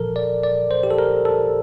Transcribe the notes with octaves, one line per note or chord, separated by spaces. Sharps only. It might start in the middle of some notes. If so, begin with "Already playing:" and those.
Already playing: A#2 F3 A4 A#4
D5
D5
C5
G4
A4
A#4
A4